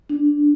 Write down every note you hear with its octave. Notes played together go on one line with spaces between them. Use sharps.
D4